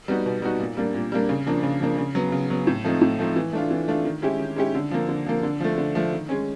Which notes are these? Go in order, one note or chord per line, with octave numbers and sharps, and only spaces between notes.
G3 B3 D#4 F#4
B2
G3 B3 D#4 F#4
A#2
G3 A#3 D4
A#2
G3 A#3 D4
C#3
F3 A#3 D4
C#3
F3 A#3 D4
C#3
F#3 B3
C#3
F#3 B3
A2
F3 A3 C4 D#4
A2
F3 A3 C4 D#4
E3
A3 D4 F4
E3
A3 D4 F4
D#3
G#3 C#4 E4 G4
D#3
G#3 C#4 E4 G4
D3
F3 A#3
D3
F3 A#3
D3
F3 A3
D3
F3 A3
D#3
G#3 C#4